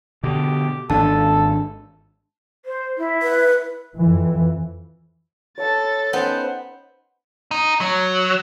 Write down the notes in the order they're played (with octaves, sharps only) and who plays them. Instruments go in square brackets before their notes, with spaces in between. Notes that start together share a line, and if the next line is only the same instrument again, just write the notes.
[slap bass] B2 D3 [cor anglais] G4
[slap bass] G#1 D4 [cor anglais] A4 [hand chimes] A5
[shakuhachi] C5
E4
[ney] B4
[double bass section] F2 E3
[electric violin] A4 A6 [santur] C#5 A5 B5
[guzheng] B3 [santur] C#4 D#4 G5 [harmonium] C5
[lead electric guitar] D#4
F#3